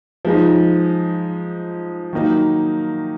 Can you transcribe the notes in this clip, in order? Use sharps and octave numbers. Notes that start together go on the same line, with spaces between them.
F3 G#3 D#4
D#3 F#3 A#3 D#4